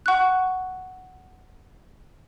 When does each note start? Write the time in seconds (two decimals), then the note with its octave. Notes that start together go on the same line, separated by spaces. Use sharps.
0.06 F#5 C#6 F#6